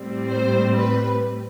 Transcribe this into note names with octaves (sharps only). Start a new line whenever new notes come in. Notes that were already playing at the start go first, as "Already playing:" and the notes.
Already playing: A2 G3 C4
C5
B4